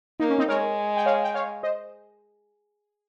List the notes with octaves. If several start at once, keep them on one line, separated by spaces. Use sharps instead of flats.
A#3 D#4
C#4
C4 D#4
G#3 A#4 C#5
G5
C#5 F5
G5
C#5 F5
C5 D#5